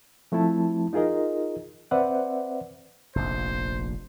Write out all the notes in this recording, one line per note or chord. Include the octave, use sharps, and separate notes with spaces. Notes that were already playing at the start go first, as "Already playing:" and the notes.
F3 A3 C4 E4 A5
D#4 F4 G#4 A#4 D#5
C4 B4 C5 D5 E5 F#5
F1 A#1 C5